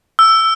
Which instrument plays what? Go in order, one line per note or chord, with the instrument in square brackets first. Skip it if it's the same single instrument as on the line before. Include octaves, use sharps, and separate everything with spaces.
[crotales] E6